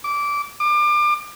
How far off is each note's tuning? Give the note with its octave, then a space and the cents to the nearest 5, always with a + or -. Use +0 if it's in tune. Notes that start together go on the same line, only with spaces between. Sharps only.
D6 -15
D6 +30